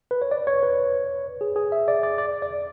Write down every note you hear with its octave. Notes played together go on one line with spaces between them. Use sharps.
B4
C#5
D5
C#5
B4
G#4
G#4
E5
D5
D5
D5
D5